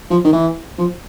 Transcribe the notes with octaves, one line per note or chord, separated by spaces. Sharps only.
F3
D#3
E3
F3